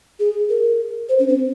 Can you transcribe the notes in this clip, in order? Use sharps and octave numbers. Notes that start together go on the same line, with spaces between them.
G#4
A#4
C5
C#4
C4